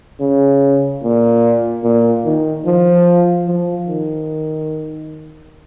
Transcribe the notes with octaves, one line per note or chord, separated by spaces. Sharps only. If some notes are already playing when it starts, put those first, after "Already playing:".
C#3
A#2
A#2
D#3
F3
F3
D#3